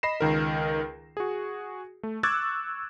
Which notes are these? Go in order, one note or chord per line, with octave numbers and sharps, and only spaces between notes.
D#5 B5 A#6 C7 E7
C#2 D#3 A#4
F#4 G#4
A3
C#6 D6 E6 F#6 G#6 A6